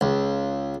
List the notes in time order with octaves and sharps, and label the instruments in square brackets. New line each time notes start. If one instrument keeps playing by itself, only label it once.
[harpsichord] C#2